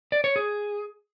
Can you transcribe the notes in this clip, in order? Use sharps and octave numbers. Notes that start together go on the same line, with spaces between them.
D5
C#5
G#4